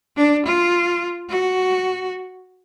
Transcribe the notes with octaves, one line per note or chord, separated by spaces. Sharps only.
D4
F4
F#4